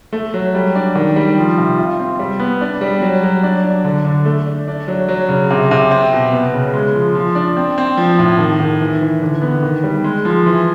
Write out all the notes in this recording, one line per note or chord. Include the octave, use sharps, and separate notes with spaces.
A3
F#3
G3
D4
D#3
G3
F3
C3
F4
C4
G3
B3
D4
G3
F#3
F#3
D4
D4
D3
D3
A3
D4
D4
F#3
F#3
C#3
C3
C3
C4
B2
B3
C#3
G#3
F3
F3
D4
C4
C4
F3
A2
D#3
D#3
E3
E3
D3
B3
D#3
G3
G#3
F3
E3